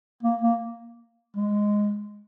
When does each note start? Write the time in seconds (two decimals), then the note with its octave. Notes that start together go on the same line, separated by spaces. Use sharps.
0.23 A#3
0.41 A#3
1.36 G#3